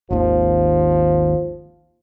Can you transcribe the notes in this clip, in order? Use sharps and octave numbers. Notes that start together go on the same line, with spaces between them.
G#1 D#2 F3